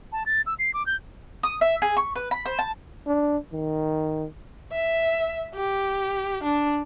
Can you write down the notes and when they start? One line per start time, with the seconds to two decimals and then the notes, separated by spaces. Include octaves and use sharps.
0.12 A5
0.26 A6
0.46 E6
0.59 C7
0.74 D6
0.86 G6
1.43 D#6
1.61 E5
1.82 G#4
1.97 C#6
2.16 B4
2.31 B5
2.45 C5
2.59 A5
3.07 D4
3.53 D#3
4.72 E5
5.54 G4
6.43 D4